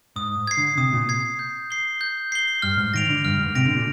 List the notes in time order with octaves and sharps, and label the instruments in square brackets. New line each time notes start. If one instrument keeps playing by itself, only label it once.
[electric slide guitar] G#2 [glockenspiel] D#6
[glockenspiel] G#6 C7
[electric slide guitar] D3
[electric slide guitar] C3 [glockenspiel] D#6
[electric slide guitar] A#2
[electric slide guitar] C3 [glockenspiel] G#6 C7
[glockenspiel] G6
C7 G7
G6
C7 G7
[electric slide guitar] G2 [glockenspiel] F6
[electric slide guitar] G#2
[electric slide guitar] D#3 [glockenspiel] A#6 D7 F7
[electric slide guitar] D3
[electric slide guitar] G2 [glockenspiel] F6
[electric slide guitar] G2
G#2
[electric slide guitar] C3 [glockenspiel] A#6 D7 F7
[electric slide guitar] D3
A#2